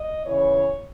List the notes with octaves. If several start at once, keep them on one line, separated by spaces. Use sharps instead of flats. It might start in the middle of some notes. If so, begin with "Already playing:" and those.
Already playing: D#5
C#3 E3 B3 C#5